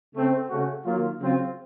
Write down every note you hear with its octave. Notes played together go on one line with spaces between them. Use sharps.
C#3 A3 C4
C#3 A3 C#4 F#4
D#3 F#3 A#3 F4
C#3 F#3 C4 F4